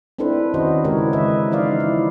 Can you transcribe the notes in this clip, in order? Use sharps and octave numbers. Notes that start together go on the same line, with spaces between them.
C4 D4 E4 A4 B4 C5
D#3 C#4 F#4 C5 D#5
C#3 G#3 E4 G4 A#4 C#5
E3 B4 D#5 E5
F3 D#4 C5 D5 F5
E4